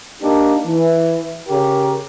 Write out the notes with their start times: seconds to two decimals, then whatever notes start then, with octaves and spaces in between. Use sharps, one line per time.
0.21 A#3 D4 D#4 G4
0.66 E3
1.48 C#3 G4 A#4